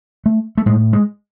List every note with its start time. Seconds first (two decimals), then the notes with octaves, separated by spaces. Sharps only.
0.26 A3
0.58 A3
0.66 A2 G#3
0.93 G#3